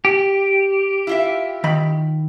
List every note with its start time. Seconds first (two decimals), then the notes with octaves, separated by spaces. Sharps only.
0.05 G4
1.07 E4 F4 E5
1.64 D#3 B5